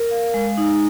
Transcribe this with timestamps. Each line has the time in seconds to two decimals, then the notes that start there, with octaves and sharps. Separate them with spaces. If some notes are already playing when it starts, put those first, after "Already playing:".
Already playing: A#4
0.11 F5
0.34 G#3
0.58 D#4